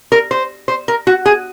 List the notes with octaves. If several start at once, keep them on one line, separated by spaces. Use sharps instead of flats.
A#4
C5
C5
A#4
F#4
G#4